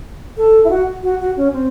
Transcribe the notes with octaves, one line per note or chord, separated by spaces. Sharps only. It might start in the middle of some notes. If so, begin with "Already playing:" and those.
A4
E4
F#4
F#4
F#4
C#4
C4